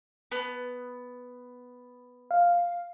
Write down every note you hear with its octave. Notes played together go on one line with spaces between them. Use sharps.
B3
F5